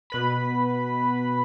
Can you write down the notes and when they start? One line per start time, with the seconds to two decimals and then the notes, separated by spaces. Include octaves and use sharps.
0.10 B2 B4 B5